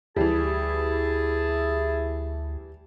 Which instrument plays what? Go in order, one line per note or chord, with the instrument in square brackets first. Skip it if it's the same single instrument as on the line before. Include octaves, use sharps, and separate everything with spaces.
[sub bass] D2 [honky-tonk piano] E3 G3 [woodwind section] E4 G#4 A5